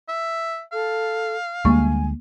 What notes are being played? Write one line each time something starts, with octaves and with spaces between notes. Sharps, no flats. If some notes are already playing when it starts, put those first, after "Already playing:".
E5
A4 F5
D2 G3 G#3 A#3 G#5 C#6